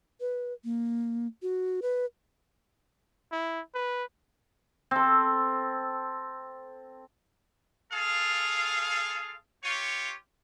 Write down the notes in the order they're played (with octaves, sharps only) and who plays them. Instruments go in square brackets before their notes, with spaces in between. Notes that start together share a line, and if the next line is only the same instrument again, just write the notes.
[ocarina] B4
A#3
F#4
B4
[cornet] E4
B4
[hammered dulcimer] C4 A4
[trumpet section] F4 G#4 A4 F5
F4 G4 C#5